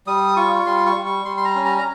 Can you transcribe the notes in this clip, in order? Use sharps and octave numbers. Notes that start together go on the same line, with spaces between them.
G3 D#6
F4 C#6
C#6
G3 C6
C#6
G3
C#6
G3 C6
C6
A#5
C#4
A#5
A#5